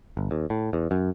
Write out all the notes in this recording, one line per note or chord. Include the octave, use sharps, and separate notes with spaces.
G1
D#2
A2
E2
F#2